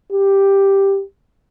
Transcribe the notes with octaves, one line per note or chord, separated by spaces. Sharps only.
G4